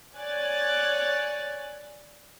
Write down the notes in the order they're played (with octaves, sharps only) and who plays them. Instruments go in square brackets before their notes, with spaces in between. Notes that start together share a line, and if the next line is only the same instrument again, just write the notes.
[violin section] C#5 D5 G#5 F#6 A6